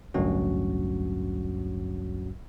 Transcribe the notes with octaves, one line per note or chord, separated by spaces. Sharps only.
A1 D2 G2 F#3 C#4 F#4